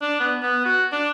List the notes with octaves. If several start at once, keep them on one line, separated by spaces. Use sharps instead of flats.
D4
B3
B3
F#4
D4